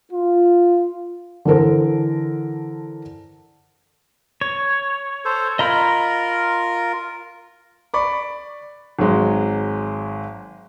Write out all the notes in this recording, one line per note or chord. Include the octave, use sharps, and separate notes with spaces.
F4
D3 E3 A4 A#4 C5
C#5
A4 C5
F4 A#4 D#5 A#5 B5
D5 B5 C#6 D6
G#1 F#3 G#3